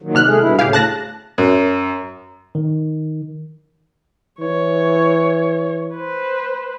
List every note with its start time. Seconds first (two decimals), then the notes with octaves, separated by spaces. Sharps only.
0.02 A#2 D#3 F#3
0.15 C3 F6 F#6
0.27 G#3 A3 G#4
0.40 G2 B2 E4
0.59 D2 A2 C#3 G4 G#4 F5
0.73 A5 F#6 A#6
1.38 F#2
2.55 D#3
4.40 E3 C#5
5.95 B4 C5